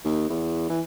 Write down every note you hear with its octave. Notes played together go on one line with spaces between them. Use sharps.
D#2
E2
E3